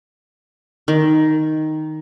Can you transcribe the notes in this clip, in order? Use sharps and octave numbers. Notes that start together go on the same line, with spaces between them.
D#3